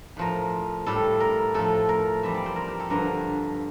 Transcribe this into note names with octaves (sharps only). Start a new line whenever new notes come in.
A2 F3 A#4
A2 G3 A4
A#4
A2 F3 A4
A#4
F2 E3 G3 E5
D5
C5
A#4
G4
A4
G2 D3 F3 A#4